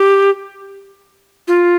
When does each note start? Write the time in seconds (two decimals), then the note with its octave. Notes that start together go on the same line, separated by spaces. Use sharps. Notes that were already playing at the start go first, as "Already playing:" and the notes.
Already playing: G4
1.48 F4